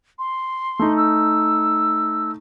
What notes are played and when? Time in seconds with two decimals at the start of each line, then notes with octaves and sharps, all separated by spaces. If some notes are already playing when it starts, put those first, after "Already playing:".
0.19 C6
0.79 A3 D#4
0.97 E6